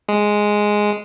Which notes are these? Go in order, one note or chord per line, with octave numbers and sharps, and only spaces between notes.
G#3